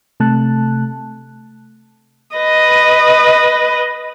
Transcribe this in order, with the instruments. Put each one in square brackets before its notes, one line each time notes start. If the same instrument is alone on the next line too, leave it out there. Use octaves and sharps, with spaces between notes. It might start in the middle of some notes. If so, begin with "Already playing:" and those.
[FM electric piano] C3 A3 A5 F#6
[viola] B4 D#5